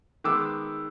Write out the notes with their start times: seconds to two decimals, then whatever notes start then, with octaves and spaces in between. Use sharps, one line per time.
0.24 D#3 G#3 B3 D6 E6